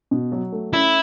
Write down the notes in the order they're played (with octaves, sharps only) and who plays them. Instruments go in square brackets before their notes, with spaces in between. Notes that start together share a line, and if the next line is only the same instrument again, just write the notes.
[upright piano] B2
F#3
A3
[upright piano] C#4 [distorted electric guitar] E4